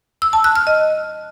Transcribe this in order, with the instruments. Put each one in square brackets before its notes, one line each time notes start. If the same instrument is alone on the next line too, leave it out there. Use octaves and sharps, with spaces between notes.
[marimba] E6
A5
F#6
F6
D#5